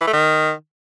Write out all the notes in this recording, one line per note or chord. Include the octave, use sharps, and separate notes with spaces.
E3
A3
D#3